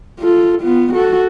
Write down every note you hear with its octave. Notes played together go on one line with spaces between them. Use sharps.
F4 A4
B3 F4
F#4 A4